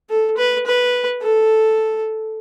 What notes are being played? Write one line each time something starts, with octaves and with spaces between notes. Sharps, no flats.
A4
B4
B4
A4